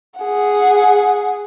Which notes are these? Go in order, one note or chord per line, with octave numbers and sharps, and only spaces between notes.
G#4 F#5